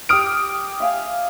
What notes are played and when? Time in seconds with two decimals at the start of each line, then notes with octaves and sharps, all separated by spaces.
0.09 G4 D6 D#6 F6 D7
0.80 E5 F5 G#5